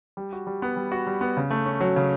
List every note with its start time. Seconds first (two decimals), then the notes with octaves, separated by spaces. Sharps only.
0.17 G3
0.33 F#4
0.47 G3
0.62 B3
0.76 G3
0.92 F#4
1.07 G3
1.21 B3
1.37 C#3
1.51 A3
1.65 C#4
1.81 F#3
1.96 C#3